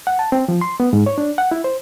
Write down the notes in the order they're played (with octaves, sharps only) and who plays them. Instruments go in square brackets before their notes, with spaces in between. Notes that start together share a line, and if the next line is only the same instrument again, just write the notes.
[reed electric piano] F#5
A5
C4
F3
C6
B3
G#2
C#5
D4
F#5
E4
C5